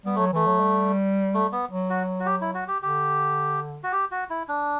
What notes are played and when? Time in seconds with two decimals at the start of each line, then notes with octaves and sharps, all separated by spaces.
0.05 G3 B3
0.15 F#3 A3
0.33 E3 A3
0.47 F#3
0.60 G3
1.34 A3
1.52 B3
1.71 F#3
1.90 F#4
2.20 F#4
2.26 G4
2.41 E4
2.55 F#4
2.68 G4
2.82 D3 G4
3.84 F#4
3.92 G4
4.11 F#4
4.30 E4
4.49 D4